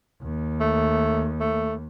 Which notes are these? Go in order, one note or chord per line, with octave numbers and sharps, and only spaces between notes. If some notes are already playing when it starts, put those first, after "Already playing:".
D#2
A3
A3